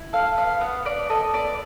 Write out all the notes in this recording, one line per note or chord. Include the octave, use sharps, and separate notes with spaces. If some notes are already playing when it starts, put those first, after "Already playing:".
Already playing: E4
A4 F5
B3 F5
B3 F#5
B3 D5
A4 D#5
B3 D5